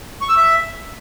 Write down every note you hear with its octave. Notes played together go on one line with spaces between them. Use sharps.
C#6
E6
E5